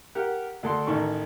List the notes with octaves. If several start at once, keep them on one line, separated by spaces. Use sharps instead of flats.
G4 A#4 F#5
D2 A4 C6
A1 D#3 A4 C#6